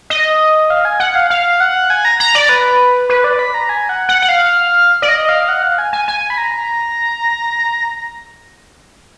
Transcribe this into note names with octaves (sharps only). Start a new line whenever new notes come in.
D#5
F5
G#5
F#5
F5
F5
F#5
G#5
A#5
A#5
D5
B4
B4
D5
B5
A#5
G#5
F#5
F#5
F#5
F5
D5
D#5
F5
F#5
F5
G#5
G#5
G#5
B5
A#5